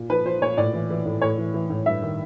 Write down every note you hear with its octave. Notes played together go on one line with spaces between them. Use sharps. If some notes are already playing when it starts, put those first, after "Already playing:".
Already playing: A#2
F3 B4
F3 C5
A#2 C#5
A2 D5
E3
E3
A2
A2 C#5
E3
E3
A2
G2 E5
D#3